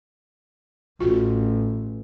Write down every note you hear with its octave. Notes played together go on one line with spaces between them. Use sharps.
A1 F4 F#4